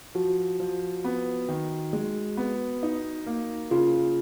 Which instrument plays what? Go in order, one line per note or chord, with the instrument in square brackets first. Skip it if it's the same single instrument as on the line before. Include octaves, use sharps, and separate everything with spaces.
[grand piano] F3 [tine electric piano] F#4
[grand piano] F3
B3
D#3
G#3
B3
D#4
A#3
[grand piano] C#3 [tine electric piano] F4